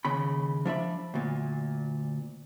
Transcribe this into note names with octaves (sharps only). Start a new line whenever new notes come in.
D#2 C#3 B5
F3 D4 E5 B5
D2 A#2